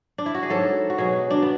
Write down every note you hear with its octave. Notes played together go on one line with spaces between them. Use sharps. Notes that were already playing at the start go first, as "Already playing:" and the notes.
D4
E4
F#4
G#4
G#2 F#3 A4
F#4
B2 F#3 G#4
D4
B3